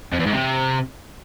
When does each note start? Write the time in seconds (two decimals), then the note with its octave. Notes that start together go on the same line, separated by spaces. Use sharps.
0.13 F2
0.20 E2
0.27 G#2
0.34 C3